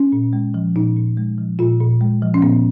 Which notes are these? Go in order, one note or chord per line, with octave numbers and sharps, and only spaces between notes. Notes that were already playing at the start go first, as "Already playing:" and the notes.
Already playing: C#4
A#2
G#3
F3
A#2 D#4
A#2
G#3
F3
A#2 F4
A#2
G#3
F3
C#4
A#2 B3